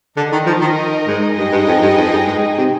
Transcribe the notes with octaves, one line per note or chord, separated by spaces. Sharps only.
D3 D#4 A#4 D#5
D#3
F3
D#3
G#2
G2 D#4 G#4 D#5 G5
G2
F2
G2
F2
G2
G#2
C3